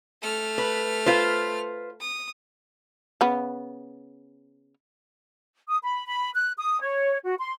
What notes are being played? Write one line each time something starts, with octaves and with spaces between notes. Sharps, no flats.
A3 F6
B4
F4 B4 C5
D#6
C#3 B3
D#6
B5
B5
F#6
D#6
C#5
F#4
C6